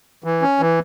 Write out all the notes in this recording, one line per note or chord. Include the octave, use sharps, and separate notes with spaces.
E3
C#4
E3